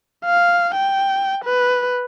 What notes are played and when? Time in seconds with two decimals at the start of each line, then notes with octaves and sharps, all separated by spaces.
0.25 F5
0.74 G5
1.45 B4